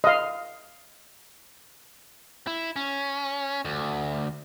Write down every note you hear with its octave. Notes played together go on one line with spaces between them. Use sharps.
D#5 F5
E4
C#4
D2